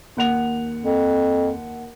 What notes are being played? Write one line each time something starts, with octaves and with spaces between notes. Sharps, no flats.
D#2 F#5 F7
F2